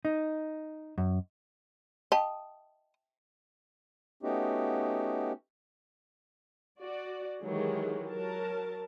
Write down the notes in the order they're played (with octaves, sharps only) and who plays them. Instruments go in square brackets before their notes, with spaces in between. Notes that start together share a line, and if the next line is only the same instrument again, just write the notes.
[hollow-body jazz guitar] D#4
F#2
[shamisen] D#5 [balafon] G5 A5
[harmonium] A3 B3 C#4 D#4 F#4 G4
[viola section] F#4 D5
D#3 E3 F#3 G#3 G4 G#4
F#3 A#4 A5